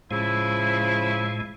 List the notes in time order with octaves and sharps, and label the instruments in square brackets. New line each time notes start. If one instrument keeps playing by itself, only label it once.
[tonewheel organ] A2 G#3 [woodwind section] C#3 F3 E4